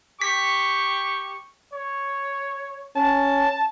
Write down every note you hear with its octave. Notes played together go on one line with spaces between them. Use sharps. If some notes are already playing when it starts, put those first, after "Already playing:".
G4 G5 C#6 B6
C#5
C#4 A5